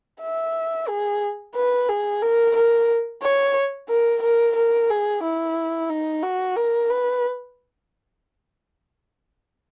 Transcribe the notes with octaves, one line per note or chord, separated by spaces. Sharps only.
E5
G#4
B4
G#4
A#4
A#4
C#5
A#4
A#4
A#4
G#4
E4
D#4
F#4
A#4
B4